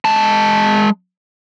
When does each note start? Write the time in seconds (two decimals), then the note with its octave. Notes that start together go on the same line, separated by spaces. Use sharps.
0.05 G#3 A5